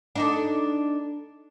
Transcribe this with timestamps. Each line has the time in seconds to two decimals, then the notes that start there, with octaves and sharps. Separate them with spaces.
0.15 D4 D#4 A4